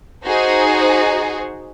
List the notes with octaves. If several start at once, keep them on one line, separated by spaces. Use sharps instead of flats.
D#4 F#4 G#4 C5